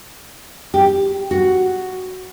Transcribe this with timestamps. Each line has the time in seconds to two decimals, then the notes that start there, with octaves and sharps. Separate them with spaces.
0.74 G4
1.31 F#4